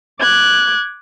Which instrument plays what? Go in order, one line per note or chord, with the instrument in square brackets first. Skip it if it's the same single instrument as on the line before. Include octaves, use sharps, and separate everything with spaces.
[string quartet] D6 F#6 G#6